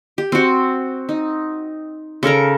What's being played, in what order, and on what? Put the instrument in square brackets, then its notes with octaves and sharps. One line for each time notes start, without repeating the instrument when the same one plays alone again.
[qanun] G4
C4 F#4
D#4
C#3 A4 A#4 A#5